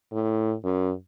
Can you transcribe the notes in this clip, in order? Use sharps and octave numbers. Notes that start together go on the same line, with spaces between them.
A2
F#2